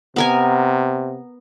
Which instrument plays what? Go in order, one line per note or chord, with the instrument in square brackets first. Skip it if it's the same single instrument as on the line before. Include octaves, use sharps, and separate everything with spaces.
[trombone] C3 [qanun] B3 A#4 G#5